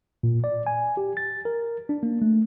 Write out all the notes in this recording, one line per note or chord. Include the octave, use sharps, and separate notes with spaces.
A#2
D5
G#5
G4
A6
A#4
D4
A#3
A3